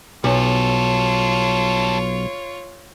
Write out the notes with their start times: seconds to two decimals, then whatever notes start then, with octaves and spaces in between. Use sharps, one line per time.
0.24 B1 G3 F4 A4 C#5